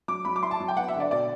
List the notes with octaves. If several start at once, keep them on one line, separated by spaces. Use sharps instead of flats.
F#3 D6
F#3 B5
D6
E4 C6
A5
F#3
G5
B3 F#5
E5
D3
D5
B2 D5